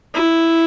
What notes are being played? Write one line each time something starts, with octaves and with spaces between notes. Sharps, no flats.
E4